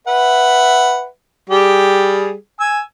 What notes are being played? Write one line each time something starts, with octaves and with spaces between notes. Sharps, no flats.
B4 E5 F#5
G3 G4 G#4
G#5 E6